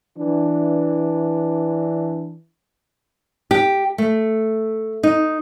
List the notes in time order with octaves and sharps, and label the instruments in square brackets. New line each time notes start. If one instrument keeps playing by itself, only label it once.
[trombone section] E3 D4
[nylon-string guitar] G4
A3
D#4